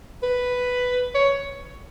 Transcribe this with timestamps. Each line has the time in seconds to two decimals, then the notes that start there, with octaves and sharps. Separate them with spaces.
0.23 B4
1.15 C#5